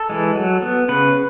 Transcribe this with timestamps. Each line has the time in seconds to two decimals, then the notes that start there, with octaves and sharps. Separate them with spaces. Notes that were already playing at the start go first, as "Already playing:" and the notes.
Already playing: A4
0.09 E3 G#3
0.35 F#3
0.62 B3
0.89 C#3 B4